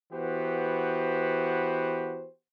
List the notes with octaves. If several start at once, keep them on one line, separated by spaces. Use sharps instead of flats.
E3 B3 F#4 G4 B4 C5